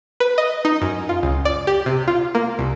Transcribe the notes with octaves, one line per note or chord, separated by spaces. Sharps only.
B4
D#5
D#4
F#2
F4
C#2
D5
G4
C3
F4
A#3
C2